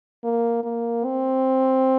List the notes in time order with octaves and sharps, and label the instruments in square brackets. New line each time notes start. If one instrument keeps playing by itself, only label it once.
[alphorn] A#3
A#3
C4